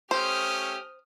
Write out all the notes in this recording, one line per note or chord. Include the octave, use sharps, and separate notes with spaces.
A3 C#4 G4 C5 D#6 F6